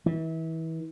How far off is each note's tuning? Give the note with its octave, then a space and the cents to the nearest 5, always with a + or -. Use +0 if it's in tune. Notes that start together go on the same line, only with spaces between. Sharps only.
E3 -30